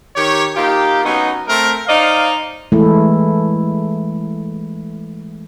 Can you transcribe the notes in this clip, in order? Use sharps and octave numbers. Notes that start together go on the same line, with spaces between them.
D#3 G4 C#5
A#3 D#4 F4 G4
F#3 B3 C#4 D#4
A3 C4 A#4
D#4 C5 D5 D#5 F5
E3 G#3 A3 E4